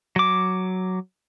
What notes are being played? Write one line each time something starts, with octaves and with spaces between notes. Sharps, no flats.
F#3 D6